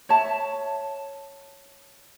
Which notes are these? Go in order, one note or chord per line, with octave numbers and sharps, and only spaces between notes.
C#5 E5 A5